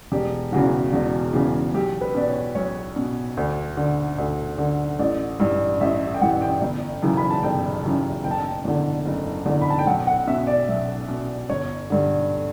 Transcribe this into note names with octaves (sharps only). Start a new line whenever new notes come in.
E1 G4
E2 C#3 E3 F#4
E1 F#4
E2 C#3 E3
B1 G4
B4
B2 D5
C#5
B1 C#5
B2
D2
D3
D2
D3
A1 D5
G2 E3
A1 E5
E5
G5
G2 E3 F#5
G5
G1
F#2 C#3 E3
B5
A5
G1 G5
F#2 C#3 E3
F#1 G5
A5
G5
E2 D3
F#1
E2 D3
B5
A5
G5
B1 F#5
F#5
B2 E5
D5
B1 E5
B2
G1 C#5
G2 D3